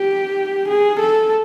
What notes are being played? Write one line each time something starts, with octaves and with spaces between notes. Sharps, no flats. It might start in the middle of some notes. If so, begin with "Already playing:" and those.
Already playing: G4
G#4
A4